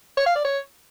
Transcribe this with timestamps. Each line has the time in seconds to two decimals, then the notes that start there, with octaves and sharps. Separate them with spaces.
0.17 C#5
0.26 F5
0.35 D5
0.45 C#5